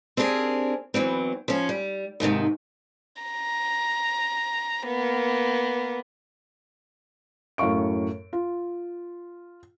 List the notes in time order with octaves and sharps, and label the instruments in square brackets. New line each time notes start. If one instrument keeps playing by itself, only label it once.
[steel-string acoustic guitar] C4 D4 G4 G#4 A#4
E2 E3 F#3 C4
F3 C#4
G3
D#2 G#2 C3 D#3
[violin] A#5
A#3 B3
[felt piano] F#2 A2 F5 C#6 D7
F4